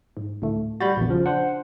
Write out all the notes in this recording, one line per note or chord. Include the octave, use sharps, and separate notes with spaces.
G#2
D2 A2 A3
G3 F#4 B5 G6 A6
A#1 E2
C#3 F3
D4 C5 F#5